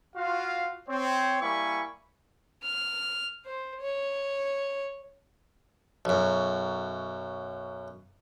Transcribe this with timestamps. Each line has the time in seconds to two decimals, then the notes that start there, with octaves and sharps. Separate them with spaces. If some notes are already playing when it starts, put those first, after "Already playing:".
0.17 F4 F#4 F5
0.89 C4 C5 C#5
1.41 G3 A#3 E4 G#5 B5 C#6
2.63 F6
3.46 C5
3.81 C#5
6.05 B1 F#2